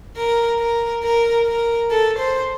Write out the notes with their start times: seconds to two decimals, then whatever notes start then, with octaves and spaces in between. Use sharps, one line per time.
0.17 A#4
0.59 A#4
1.03 A#4
1.46 A#4
1.91 A4
2.19 C5